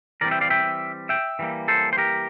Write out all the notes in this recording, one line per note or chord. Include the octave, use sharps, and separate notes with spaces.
E3 G3 C4 A#4 D5
E5 G5
D5 F5
E5 G5
E5 G5
E3 G3 A#3
A4 C5
C5
G4 A#4